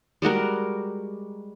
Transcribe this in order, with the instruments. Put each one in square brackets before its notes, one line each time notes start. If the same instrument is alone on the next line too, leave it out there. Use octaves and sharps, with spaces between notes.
[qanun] G3 G#3 F#4 A#4